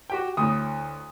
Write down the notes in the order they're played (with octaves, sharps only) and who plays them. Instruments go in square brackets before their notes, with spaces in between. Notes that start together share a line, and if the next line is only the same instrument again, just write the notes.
[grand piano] F#4 G4 G5
[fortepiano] D2 A2 [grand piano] D#6